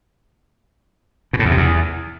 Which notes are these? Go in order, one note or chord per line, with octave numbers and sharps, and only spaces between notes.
B2
A2
E2
C3
E2